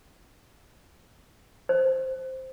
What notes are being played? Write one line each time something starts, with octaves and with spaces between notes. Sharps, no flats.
C5